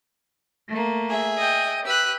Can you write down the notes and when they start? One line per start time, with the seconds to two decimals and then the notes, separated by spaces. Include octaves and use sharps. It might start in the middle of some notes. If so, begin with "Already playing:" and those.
0.69 A3 A#3
1.09 G#4 E5
1.39 D#5 G5
1.86 G4 B4 E6 F#6